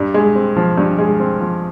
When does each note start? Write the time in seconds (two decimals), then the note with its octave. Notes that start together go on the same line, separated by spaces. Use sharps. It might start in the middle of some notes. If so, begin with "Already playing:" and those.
Already playing: G2
0.14 G#3
0.36 C4
0.57 F3
0.78 G2
0.98 G#3
1.20 C4
1.40 F3